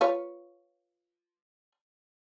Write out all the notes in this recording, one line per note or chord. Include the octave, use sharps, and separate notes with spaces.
F4 B4 C#5